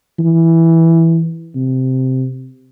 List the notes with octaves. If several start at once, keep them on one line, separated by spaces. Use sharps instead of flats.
E3
C3